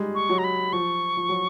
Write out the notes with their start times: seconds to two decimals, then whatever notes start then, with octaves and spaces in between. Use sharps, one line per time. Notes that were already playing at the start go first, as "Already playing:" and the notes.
Already playing: G3 G#3
0.15 C#6
0.30 F#3
0.38 A#5
0.44 B5
0.73 F3 C#6
1.17 F3
1.29 F#3